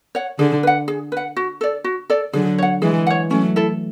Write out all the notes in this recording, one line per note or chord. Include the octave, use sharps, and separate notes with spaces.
C#5 F#5
D3 G#4
B4 F#5
G#4
B4 F#5
F#4
A4 D5
F#4
A4 D5
D3 F#3 G#4
C#5 F#5
E3 G#3 G#4
C#5 F#5
F#3 A3 C#4
E4 A4